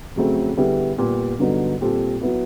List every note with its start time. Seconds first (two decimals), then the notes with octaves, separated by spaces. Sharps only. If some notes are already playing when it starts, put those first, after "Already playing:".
0.16 F2 C#3 F#3 A3 C4
0.57 D3 G3 B3 E4 G#4
0.98 A#2 G3 B3
1.39 G2 D3 F#3 B3 D#4
1.81 A#2 G3 C4 F4 A4
2.21 F#3 B3 E4